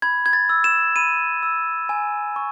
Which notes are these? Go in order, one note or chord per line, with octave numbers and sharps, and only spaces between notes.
B5 G#6
G#6
A6
E6
E7
B5 D#7
E6
G#5
C#6